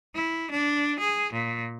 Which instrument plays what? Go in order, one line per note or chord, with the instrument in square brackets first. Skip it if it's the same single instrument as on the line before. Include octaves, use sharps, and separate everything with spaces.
[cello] E4
D4
G#4
A#2